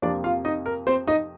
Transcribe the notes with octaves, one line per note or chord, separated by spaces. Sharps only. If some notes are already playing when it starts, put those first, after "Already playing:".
F2 C3 F3 A#3 D4 D5
F4 F5
D#4 D#5
A#4
C4 C5
D#4 D#5